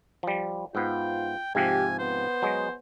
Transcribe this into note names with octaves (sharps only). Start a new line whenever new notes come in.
F3 G3
G#2 B3 F4 G5
G#2 C3 F3 G4 G#5
B3 C5
F#3 G#3